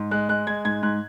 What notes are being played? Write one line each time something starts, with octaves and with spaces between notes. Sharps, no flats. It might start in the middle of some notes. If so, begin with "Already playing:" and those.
Already playing: G#2
G#3 F#6
G#3 F#6
G#3 G#6
G#2 G#6
G#2 F#6